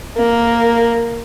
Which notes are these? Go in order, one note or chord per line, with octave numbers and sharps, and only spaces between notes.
A#3